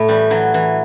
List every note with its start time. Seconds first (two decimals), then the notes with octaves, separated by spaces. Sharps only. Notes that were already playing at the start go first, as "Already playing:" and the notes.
Already playing: A2 A3
0.08 E3 G3
0.30 E3 F#3
0.54 E3